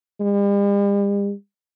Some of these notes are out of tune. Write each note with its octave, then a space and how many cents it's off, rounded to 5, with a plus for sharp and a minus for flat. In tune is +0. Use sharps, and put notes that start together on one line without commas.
G3 +45